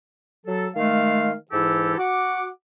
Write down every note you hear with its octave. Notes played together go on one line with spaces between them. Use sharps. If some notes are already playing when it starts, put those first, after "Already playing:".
F#3 A4
D#3 G#3 A3 F5
G#2 E3 E4 G4 A4 E6
F#4 F#5 D6